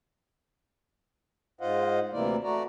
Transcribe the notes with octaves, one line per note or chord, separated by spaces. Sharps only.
G#2 F4 C5 D#5 F5 F#5
D2 C3 E3 A#3 E4 D5
A3 F#4 D5 A#5